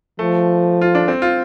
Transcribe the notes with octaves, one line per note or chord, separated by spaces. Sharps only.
F3 A3
F4
D4
C4
F4